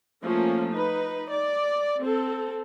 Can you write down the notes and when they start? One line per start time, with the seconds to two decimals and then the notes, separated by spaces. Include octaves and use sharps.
0.23 F3 A3 A#3 C#4
0.72 D#4 B4
1.29 D5
2.00 C4 A4